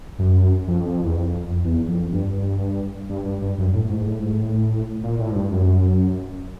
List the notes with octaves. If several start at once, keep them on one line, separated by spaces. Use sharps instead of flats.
F#2
F2
E2
F2
E2
F2
G2
G2
G2
G2
F#2
A2
A2
G#2
A2
G#2
A2
A#2
A2
G#2
G2
F#2